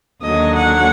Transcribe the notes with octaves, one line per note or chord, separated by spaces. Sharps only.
D#2 D3 F#3 D#5
F#5